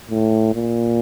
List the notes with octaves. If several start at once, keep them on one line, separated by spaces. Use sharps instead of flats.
A2
A#2